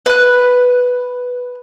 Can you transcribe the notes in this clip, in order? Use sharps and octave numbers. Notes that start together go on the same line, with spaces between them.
B4 F#6